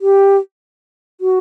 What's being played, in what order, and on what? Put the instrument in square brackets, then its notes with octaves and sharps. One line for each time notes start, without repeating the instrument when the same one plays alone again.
[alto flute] G4
F#4